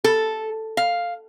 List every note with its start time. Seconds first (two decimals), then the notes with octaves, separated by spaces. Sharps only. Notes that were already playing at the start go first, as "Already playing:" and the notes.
0.04 A4
0.77 F5